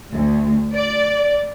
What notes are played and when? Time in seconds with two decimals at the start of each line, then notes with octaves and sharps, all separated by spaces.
0.13 D2
0.75 D5